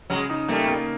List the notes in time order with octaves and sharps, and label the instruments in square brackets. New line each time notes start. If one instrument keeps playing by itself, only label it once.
[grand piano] C#3 [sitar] F#3 G#3
[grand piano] D#4
[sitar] G3 A3 [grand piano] A#3
[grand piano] A#3